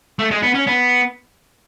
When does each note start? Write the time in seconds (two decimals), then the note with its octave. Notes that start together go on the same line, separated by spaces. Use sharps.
0.19 A3
0.31 G#3
0.42 B3
0.54 C#4
0.67 B3